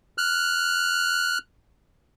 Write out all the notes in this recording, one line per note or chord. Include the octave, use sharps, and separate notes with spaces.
F6 F#6